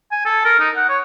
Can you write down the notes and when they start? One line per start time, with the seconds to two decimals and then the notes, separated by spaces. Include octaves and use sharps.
0.12 G#5
0.25 A4
0.45 A#4
0.60 D#4
0.76 F#5
0.89 C#5